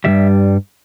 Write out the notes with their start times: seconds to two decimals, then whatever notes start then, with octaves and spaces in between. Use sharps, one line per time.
0.04 G2 E3 G3 E5